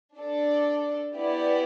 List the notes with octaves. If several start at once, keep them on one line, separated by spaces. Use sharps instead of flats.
D4 A4 D5
B3 E4 G4 D5